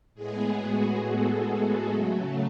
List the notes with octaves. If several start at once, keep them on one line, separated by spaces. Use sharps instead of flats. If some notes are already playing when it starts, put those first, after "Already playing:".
A2 G#3 B3 G#4
F#4
A4
C#3 F#3 A3